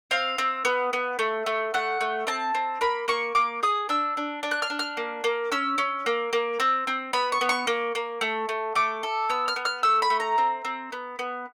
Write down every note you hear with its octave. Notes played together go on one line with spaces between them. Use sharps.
C4 F5
C4
B3
B3
A3
A3
A3 F#5
A3
C4 A5
C4
A#3 B5
A#3 C#6
A#3 D6
G#4 D#6
D4 E6
D4
D4
F#6
F6
D4
F6
A#3
A#3
C#4 E6
C#4
A#3
A#3
C4
C4
B3 B5
C#6
B3
C#6
A#3
A#3
A3
A3
A3 D6
A4
B3 E6
F6
B3
F6
A3 E6
B5
A3
A#5
C4
C4
B3
B3